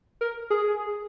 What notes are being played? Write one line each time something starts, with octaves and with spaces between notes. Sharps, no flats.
A#4
G#4